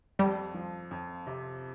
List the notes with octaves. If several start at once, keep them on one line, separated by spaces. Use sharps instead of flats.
F2 G3
F3
F2
C3